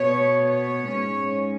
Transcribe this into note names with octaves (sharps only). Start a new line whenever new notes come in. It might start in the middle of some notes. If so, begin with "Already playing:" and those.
Already playing: B2 B3 C#5
C#5
G#2 G#3 C#4